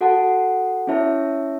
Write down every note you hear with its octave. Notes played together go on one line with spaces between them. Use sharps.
F#4 A4 F#5 A5
C#4 E4 C#5 E5 A5